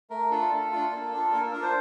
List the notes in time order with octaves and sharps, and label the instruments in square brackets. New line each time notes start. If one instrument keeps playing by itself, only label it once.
[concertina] A3 A#4
D4 F4 A4
A3
D4 F4
A#3
D4
F4
A#3 A#4
A4
D4 F4 A#4
C5